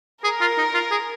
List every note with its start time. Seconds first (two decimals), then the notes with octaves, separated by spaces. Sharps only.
0.24 G#4 A#4
0.41 F4
0.58 D#4
0.74 F4
0.91 G#4